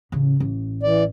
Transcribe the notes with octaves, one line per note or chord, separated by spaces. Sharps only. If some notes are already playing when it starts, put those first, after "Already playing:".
A1 C#3
A1
E3 D5